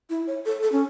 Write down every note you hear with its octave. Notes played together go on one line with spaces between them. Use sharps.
E4
C#5
A4
A4
C#4